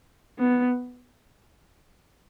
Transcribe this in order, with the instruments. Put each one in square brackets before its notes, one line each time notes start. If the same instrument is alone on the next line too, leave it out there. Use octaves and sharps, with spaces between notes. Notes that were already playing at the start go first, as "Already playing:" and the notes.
[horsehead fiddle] B3